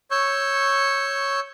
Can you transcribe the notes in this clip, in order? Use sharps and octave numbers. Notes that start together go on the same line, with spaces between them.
C#5 C#6 E6 G6